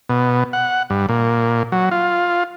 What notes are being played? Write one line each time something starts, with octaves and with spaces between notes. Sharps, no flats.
B2
F#5
G2
A#2
F#3
F4